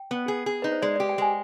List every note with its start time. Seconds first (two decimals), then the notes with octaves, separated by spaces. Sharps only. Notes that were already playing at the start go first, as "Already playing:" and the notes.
Already playing: G5
0.11 B3
0.28 G#4
0.46 G#4
0.62 D#4 B4
0.72 C5
0.82 G#3 D5
0.96 G4 D5
1.09 G5
1.18 G#3 G#5